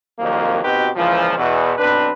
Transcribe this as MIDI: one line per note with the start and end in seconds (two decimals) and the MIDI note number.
0.19 0.62 36
0.19 0.62 41
0.19 0.62 51
0.19 0.62 53
0.19 0.62 54
0.19 0.62 58
0.63 0.89 47
0.63 0.89 60
0.63 0.89 63
0.63 0.89 66
0.63 0.89 67
0.63 0.89 71
0.96 1.34 37
0.96 1.34 46
0.96 1.34 52
0.96 1.34 53
1.38 1.72 40
1.38 1.72 47
1.78 2.10 35
1.78 2.10 60
1.78 2.10 62
1.78 2.10 71